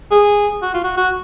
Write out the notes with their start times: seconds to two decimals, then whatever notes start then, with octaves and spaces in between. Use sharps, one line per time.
0.11 G#4
0.62 F#4
0.74 F4
0.84 F#4
0.97 F#4